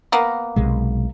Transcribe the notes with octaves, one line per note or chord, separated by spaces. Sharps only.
A#3 B3
B1 C3 G#3